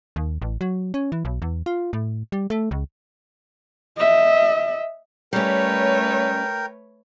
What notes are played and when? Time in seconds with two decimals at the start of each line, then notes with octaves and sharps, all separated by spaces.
0.16 D#2
0.42 A1
0.61 F#3
0.94 C#4
1.12 E3
1.25 B1
1.42 E2
1.66 F4
1.93 A2
2.32 G3
2.50 A3
2.71 C#2
3.97 D#5 E5
5.33 G3 A3 C#4 A#4 B4 C#5 G5